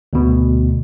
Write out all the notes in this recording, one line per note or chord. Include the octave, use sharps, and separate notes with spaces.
D2 B2